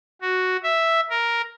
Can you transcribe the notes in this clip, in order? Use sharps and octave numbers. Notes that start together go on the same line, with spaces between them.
F#4
E5
A#4